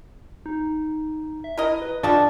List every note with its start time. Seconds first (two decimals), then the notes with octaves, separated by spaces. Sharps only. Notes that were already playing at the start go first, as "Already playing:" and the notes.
0.46 D#4
1.44 E5
1.58 E4 A#4 D#5
1.82 B4
2.03 G3 D4 F4 A4 D#5 A5 C#6